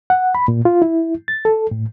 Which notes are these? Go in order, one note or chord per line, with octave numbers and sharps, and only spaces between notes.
F#5
B5
A#2
F4
E4
A6
A4
A2